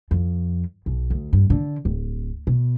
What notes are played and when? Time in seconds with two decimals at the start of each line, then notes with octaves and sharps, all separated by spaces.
0.11 F2
0.86 B1
1.10 D2
1.33 G2
1.50 D3
1.85 D1
2.47 B2